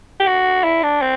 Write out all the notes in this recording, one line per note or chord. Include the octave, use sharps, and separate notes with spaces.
G4
F#4
E4
D4
C4